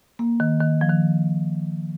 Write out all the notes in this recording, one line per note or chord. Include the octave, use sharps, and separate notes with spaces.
A#3
D#3
D#3
F3
D#3